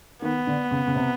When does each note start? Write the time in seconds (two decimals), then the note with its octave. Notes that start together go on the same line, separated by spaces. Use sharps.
0.22 D#3 B3
0.47 D3
0.71 C#3
0.87 C#3
0.95 C3